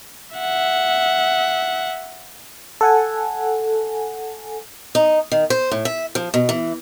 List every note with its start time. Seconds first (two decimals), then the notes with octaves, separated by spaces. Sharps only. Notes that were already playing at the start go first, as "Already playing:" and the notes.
0.36 E5 F#5
2.81 A4 F#5 G#5
4.95 D#4
5.32 D#3
5.50 C5
5.71 A2
5.85 E5
6.15 F3
6.34 B2
6.49 E3